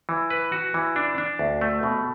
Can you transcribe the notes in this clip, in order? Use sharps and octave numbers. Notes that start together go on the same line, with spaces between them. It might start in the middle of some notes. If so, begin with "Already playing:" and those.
E3
B4
F#4
E3
D4
D4
D2
A3
B2